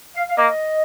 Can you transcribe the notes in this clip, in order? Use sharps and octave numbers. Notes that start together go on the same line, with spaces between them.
F5
F5
A#3 D#5